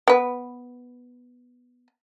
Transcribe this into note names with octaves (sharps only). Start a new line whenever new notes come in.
B3 B4